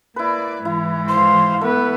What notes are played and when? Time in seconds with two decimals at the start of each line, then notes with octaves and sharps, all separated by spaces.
0.16 A#3 E4 B4 D5
0.65 G#2 E3 E4
1.08 C5 F5 C6
1.61 A3 B3 B4